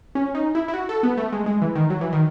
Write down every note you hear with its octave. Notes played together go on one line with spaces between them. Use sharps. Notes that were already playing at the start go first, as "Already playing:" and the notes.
C#4
D#4
E4
E4
F#4
A4
B3
A3
G#3
G#3
E3
D#3
F#3
E3
D#3